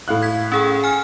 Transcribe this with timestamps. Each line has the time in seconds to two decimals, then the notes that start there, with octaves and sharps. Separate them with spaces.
0.08 A2 F5 F#6
0.22 G#6 B6
0.52 C#4 G#4 G5
0.84 G#5 F6